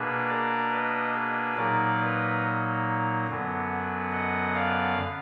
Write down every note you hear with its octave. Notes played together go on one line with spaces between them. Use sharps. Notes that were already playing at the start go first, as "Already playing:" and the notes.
Already playing: B2 A#3 D4 G#4 B4
A#4 D5
B4 D#5
G#4 B4
A#2 F#3 A#3 D#4 A#4 D5
B4 D#5
F#2 D3 F#3 B3
D#5 F#5
D5 F5